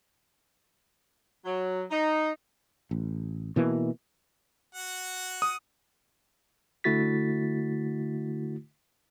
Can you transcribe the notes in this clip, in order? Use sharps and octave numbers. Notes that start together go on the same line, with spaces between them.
F#3
D#4
A1
B2 E3 A#3
F#4 F#5
D#6
D3 A3 E4 F#4 A6 B6